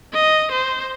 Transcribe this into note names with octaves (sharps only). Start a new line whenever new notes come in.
D#5
C5